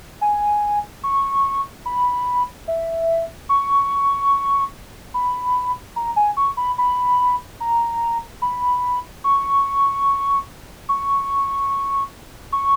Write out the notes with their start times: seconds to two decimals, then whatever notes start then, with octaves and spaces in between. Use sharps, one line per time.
0.21 G#5
1.04 C#6
1.86 B5
2.68 E5
3.49 C#6
5.14 B5
5.96 A#5
6.16 G#5
6.37 C#6
6.57 B5
6.78 B5
7.60 A#5
8.42 B5
9.24 C#6
10.89 C#6
12.52 C#6